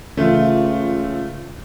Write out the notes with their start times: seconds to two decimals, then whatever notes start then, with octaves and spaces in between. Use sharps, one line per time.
0.17 C#2 C#3 E3 A3 F4